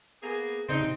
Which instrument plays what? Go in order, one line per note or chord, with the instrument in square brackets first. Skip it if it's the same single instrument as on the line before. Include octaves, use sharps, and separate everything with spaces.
[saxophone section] A#3 B3 G#4
[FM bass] C#3 [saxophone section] C4 D4 D#4
[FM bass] C3